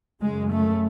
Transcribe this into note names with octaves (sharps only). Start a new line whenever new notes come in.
F#2 C#3 G#3
A3